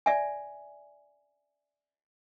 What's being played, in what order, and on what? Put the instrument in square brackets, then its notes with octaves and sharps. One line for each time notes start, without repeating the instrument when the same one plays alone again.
[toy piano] D5 E5 G#5